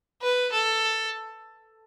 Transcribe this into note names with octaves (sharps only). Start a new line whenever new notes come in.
B4
A4